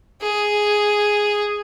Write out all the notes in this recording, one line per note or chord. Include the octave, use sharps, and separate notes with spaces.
G#4